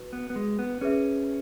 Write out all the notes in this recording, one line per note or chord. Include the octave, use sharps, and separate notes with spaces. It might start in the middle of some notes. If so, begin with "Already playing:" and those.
Already playing: F#4 B4
B3
B3
G#3
B3
C#4 G#4 B4 E5